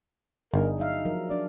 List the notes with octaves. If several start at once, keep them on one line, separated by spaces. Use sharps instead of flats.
G1 D4 D#4 G#4 A#4
F#3 D#4 E5 F5
F3 F#3 A#4
F3 D4 D5